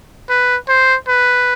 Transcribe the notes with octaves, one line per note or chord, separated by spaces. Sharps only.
B4
C5
B4